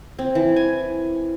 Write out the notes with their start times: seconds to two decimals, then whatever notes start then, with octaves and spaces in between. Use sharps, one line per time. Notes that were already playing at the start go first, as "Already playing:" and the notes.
0.19 C4
0.35 E3
0.56 G#5